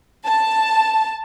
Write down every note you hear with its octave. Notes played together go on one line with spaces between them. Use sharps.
A5